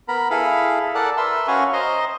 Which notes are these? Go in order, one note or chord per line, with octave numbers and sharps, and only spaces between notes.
B3 A#4 A#5 B5
E4 G#4 A4 F5 B5
A4 A#4 D5 F#5 A5
A#4 B4 E5 C6 E6
C#4 F#4 F5 F#5 G#5 C#6
C5 D#5 A#5 C6